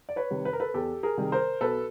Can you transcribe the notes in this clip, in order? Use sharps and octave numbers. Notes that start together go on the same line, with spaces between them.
D5
B4 C#5
C3 D#3 G3
B4
A#4
A4 B4
E2 G4 A4
G#4 A#4
C3 D#3 G3
A#4 C5
B1 A4 B4